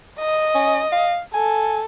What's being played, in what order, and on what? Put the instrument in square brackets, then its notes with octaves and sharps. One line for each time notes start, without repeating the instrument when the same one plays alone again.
[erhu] D#5
[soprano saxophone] C#4
F5
[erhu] A4 [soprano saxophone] G#5